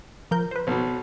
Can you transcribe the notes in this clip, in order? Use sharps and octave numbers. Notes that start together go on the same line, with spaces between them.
F3 A#4 G6
B4 C5
B1 B2